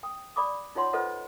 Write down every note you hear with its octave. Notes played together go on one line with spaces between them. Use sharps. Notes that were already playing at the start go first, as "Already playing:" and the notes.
G5 D#6
D5 B5 D6 D#6
D#4 F4 C#5 F#5 C6
F4 A4 B4 C5 D#5 F#5